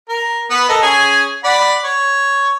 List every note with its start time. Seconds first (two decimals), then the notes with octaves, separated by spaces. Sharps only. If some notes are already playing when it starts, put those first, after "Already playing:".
0.09 A#4
0.50 B3 B4
0.69 A4 A#4 D#5
0.82 C#4 G#4
1.44 D5 F#5 B5
1.84 C#5